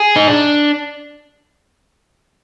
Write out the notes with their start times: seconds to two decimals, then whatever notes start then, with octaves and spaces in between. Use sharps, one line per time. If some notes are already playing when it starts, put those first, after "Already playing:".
Already playing: G#4
0.16 D#4
0.27 D4